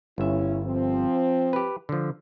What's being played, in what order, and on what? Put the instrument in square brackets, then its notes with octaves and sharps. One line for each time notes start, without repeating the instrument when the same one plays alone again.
[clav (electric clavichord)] G1 E5 [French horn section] C#4 E4
[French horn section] F3 C4
[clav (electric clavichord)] G4 B4
D3 F3